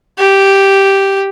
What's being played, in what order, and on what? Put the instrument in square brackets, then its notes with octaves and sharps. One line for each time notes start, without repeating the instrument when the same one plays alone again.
[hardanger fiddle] G4